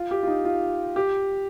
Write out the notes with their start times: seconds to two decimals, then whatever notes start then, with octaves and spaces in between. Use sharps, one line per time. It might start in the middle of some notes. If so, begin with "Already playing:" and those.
Already playing: F4
0.11 G4
0.23 F4
0.28 D#4
0.45 F4
0.96 G4